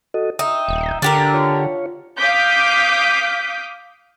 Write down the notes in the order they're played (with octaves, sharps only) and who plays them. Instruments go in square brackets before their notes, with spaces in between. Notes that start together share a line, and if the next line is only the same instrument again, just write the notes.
[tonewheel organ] F#4 A4 D#5
[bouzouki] D#4 [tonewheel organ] E5 G5
[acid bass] D#1
[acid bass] D3 [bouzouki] D4 G4 A#4
[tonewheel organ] F4 C#5
[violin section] F5 D6 D#6 G6 B6